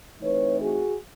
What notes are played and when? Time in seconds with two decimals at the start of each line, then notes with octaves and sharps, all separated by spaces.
0.21 E3 A3 C4 D#4 B4 C#5
0.59 F#4 G#4